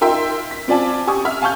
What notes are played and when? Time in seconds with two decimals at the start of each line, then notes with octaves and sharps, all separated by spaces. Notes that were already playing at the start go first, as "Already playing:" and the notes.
0.01 D#4 F4 A#4 E5 G5 C6
0.51 B6
0.68 C4 F4 D5 G#5 A5
1.07 G4 G#5 C#6 D#6
1.25 E5 F6
1.42 F5 G#5 A5 C#6 F6 G6